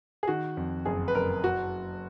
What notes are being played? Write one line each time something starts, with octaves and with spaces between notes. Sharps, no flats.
G#4
D#3 F#4
F2
F#1 G#4
B4
F#1 A#4
F#4